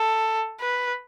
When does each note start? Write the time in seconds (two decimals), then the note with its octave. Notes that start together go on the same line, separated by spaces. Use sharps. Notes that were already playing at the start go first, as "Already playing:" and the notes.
Already playing: A4
0.61 B4